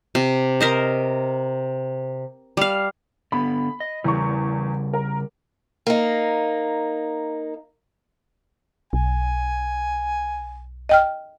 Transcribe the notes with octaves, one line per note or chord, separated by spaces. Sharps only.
C3
A#4 C5 D#5
G3 F5
D3 B3 B5
D#5
E2 C#3 G3 C#6
A#4
A#3 D#4
B1 G#5
D#5 G5 F6